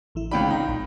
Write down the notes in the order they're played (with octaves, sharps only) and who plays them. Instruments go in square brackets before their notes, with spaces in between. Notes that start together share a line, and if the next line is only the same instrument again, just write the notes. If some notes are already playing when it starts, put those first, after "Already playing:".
[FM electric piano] A1 E3 E4
[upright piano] C#2 G5 B5 [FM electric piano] C4 D#4 D5
[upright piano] D#4 [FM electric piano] A#5
[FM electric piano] A#1